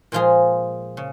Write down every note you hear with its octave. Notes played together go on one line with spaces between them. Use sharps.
A#2 F3 G#3 F4 G#4
C#3